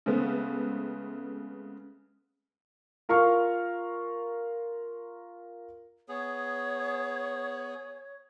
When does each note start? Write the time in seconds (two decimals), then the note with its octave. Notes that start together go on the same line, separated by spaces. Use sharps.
0.06 C#3 G#3 A3 B3 C4
3.09 F4 A#4 F5 C#6 F6
6.09 B3 G#4 C#5